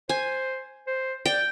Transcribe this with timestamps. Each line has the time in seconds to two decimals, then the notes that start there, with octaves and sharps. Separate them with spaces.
0.09 C5 G#5
0.87 C5
1.26 D5 G5